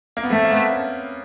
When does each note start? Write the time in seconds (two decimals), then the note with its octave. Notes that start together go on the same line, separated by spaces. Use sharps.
0.17 A#3
0.23 B3
0.31 A3 C4
0.45 A#3
0.51 B3
0.72 C#4